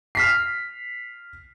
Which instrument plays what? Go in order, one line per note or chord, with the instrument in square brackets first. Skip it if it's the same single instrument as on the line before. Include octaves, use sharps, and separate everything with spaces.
[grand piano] F6 B6 C7